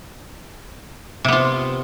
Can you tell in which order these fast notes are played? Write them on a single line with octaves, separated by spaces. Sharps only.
C3 B3 F4